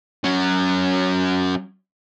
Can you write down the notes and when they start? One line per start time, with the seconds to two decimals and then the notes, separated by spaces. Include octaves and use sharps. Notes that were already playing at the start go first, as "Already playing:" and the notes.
0.24 F#3 C#4